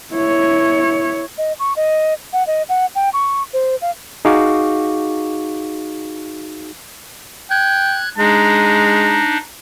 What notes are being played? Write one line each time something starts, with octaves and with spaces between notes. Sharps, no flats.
E4 C#5
D#5
C#6
D#5
F#5
D#5
F#5
G5
C#6
C5
F5
D#4 F#4 G#4 F5 C#6 D6
G5 F#6 G#6
G#3 D4 D#4 A#5